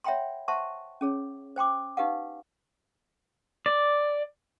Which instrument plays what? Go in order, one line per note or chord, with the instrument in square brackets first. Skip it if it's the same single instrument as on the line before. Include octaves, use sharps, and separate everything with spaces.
[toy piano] C#5 E5 F#5 G5 B5 C6
C5 E5 F#5 A5 C6 C#6
C#4 G#4 C#5
C5 G5 C6 D6
D#4 G4 B4 F5 F#5
[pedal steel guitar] D5